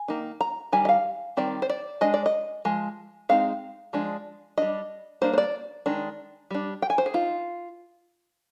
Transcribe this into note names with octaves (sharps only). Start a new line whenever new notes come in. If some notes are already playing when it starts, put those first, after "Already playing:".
Already playing: G#5
D#3 A#3 D#4
A#5
D#3 G3 G#5
D#5
F5
D#3 G3 C4 D5
C5
D5
G#3 D4 D#5
D5
D#5
F3 G#3
G#3 C4 D#4 F5
F3 G#3 D4
G3 D4 D#5
G3 A#3 D4 C5
C5
D5
D#3 G#3 D4
G3 D4
G5
G#5
C5
G#4
D#4 F4